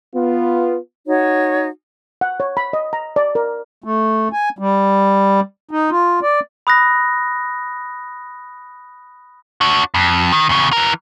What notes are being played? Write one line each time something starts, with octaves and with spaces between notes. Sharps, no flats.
B3 F4
D#4 F#4 C#5
F#5
C#5
B5
D#5
A#5
D5
A#4
A3
G#5
G3
D#4
F4
D5
B5 D#6 F#6 A#6
D4 F#4
F2
D#3
E2 C#3
E3 A#4